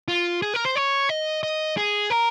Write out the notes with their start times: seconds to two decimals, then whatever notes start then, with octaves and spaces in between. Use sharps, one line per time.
0.08 F4
0.42 G#4
0.54 A#4
0.65 C5
0.76 C#5
1.09 D#5
1.43 D#5
1.77 G#4
2.10 A#4